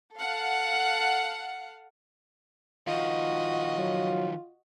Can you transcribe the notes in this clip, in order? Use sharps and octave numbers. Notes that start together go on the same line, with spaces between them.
A4 F5 F#5
D#3 F3 F4 F#4 D#5
F#3